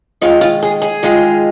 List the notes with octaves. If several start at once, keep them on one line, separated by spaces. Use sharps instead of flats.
D#3 G#3 F4 F5
F4
G#4
G#4
D#3 G#3 F4